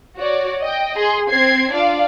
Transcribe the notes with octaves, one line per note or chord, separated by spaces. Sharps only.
F#4 C#5 D5
D#5 G5
G#4 C6
C4 G#6 C7
D4 F4 D5 F5